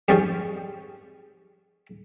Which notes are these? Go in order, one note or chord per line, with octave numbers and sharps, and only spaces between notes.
F2 G#2 G3 C#4 G#4 C5